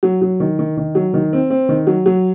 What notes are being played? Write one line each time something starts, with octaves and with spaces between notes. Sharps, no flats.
F#3
F#3
D#3
D#3
D#3
F#3
D#3
C4
C4
D#3
F#3
F#3